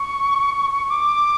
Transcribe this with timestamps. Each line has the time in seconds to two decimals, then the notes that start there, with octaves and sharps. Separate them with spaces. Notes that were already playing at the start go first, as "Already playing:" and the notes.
Already playing: C#6
0.90 D6